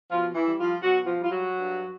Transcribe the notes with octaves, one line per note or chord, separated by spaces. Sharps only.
B2 F3 F4
E3 E4
G3
F3 F4
B2 F#3 F#4
F3 F4
G3
F4
F#3 F#4
G2